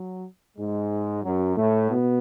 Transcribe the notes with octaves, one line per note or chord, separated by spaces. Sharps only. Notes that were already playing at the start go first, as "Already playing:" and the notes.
Already playing: F#3
G#2 G#3
F#2 F#3
A2 A3
B2 B3